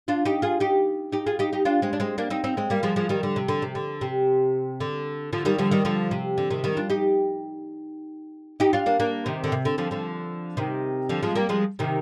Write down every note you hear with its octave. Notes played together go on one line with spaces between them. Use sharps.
D4 F4
D#4 G4
F4 G#4
D#4 G4
D#4 G4
F4 G#4
D#4 G4
D#4 G4
D4 F4
G#3 C4
D4
G#3 C4
A#3 D4
C4 D#4
C4 D#4
G#3 C4
G3 A#3
F3 G#3
F3 G#3
D#3 G3
D3
C3
D3
C3
D3
C3
D3
D3 F3
D#3 G3
D3 F3
D#3 G3
D3 F3
C3
D3
C3 D#3
D#3 G3
D4 F4
D#4 G4
D#4 G4
D4 F4
A#3 D4
A#3 D4
C3 D#3
D3
C3
D3
D3 F3
D3 F3
C3 D#3
D3 F3
F3 G#3
G3 A#3
F3 G#3
C3 D#3